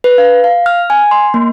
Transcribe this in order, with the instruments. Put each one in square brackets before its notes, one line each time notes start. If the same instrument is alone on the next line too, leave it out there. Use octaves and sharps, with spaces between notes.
[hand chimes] B4
F5
F5
F6
G#5
C6
A#3